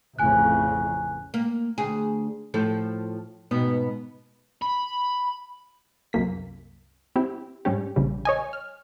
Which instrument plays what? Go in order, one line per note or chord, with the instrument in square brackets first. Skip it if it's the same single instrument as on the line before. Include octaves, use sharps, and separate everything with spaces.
[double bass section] A1 F2 C#3 [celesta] G#5 F#6
[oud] A#3
D2 G#4
A2 F3 A4
G#2 B2 B3
[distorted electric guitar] B5
[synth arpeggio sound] C2 F#2 A#3 B6
C4 E4 G4
G#2 G3 C#4 G4
A#1 C#3 G3
C#5 D#5 G#5
F6